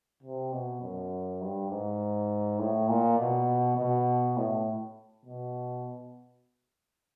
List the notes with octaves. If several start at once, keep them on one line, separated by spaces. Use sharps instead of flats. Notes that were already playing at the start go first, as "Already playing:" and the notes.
C3
B2
F#2
G2
G#2
A2
A#2
B2
B2
A2
B2